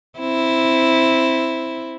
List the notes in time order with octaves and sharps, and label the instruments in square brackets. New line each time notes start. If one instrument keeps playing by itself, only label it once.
[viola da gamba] C4 E4